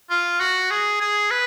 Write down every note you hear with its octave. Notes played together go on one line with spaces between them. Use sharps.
F4
F#4
G#4
G#4
B4